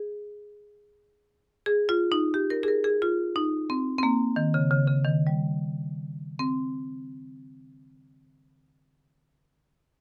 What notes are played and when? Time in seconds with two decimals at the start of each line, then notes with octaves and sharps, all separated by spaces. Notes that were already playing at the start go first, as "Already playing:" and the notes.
Already playing: G#4
1.66 G#4
1.89 F4
2.12 D#4
2.34 G4
2.50 A#4
2.63 G#4
2.68 A#4
2.84 G#4
3.02 F4
3.36 D#4
3.70 C4
3.98 C4
4.03 A#3
4.36 D#3
4.54 C#3
4.71 C#3
4.87 C#3
5.04 D#3
5.27 G3
6.39 C4